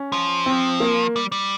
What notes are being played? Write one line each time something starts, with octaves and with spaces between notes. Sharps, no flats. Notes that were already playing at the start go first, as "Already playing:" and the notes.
Already playing: C#4
F3
C4
A#3
G3
G3